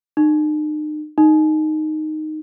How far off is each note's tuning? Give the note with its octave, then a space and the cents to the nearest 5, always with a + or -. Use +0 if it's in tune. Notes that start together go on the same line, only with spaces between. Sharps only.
D#4 -40
D#4 -5